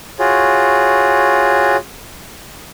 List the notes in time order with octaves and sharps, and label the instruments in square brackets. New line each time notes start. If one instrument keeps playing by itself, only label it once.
[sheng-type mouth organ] F4 F#4 G#4 C#5